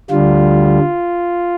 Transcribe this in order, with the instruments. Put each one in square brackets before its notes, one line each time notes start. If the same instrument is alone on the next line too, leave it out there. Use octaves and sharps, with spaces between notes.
[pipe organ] D2 D3 G3 F4